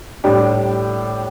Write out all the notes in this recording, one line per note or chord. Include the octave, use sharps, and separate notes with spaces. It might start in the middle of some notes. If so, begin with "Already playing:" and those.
A2 G3 D4 G4